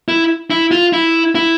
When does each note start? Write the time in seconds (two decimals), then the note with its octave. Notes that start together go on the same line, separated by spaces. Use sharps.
0.08 E4
0.50 E4
0.71 F4
0.93 E4
1.35 E4